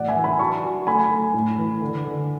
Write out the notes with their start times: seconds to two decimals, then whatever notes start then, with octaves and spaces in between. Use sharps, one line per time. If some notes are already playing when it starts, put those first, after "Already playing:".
Already playing: A2 E3 D5 F#5
0.08 E5 G#5
0.16 E3
0.24 G#5 B5
0.39 F#3 A5 C#6
0.63 F#3
0.87 A3 G#5 B5
1.11 A3
1.34 A2
1.58 E3
1.82 D3
2.04 D3